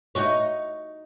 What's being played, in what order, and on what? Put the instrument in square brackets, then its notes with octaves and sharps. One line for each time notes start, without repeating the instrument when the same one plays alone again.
[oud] D#4 F#4 C#5